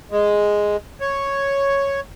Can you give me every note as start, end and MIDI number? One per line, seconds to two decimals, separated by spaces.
0.11 0.77 56
1.01 2.00 73